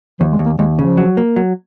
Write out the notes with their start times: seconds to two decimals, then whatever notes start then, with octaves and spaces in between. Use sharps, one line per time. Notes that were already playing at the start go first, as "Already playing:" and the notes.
0.20 D#2 F3
0.33 G#3
0.39 D#2
0.46 A#3
0.59 D#2 G#3
0.78 C#3 F3
0.97 F#3
1.17 A#3
1.36 F#3